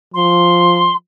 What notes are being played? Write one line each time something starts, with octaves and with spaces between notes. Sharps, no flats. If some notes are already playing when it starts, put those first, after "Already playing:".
F3 C6